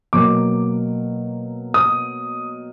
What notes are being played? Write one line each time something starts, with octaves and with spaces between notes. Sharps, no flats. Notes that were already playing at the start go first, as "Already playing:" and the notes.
B2 F#3 A#3 D6
D#6